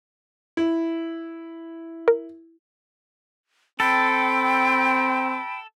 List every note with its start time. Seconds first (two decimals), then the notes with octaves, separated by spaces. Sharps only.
0.57 E4
2.08 A#4
3.80 C4 A4 G5 B5